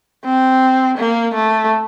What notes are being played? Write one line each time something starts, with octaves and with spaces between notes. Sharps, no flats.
C4
A#3
A3